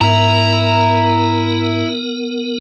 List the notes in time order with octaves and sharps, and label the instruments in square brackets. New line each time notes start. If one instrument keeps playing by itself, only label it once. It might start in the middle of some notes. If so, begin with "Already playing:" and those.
[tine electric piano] G#2 [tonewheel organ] B3 A#4 [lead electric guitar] E4 E5 [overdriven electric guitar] A#5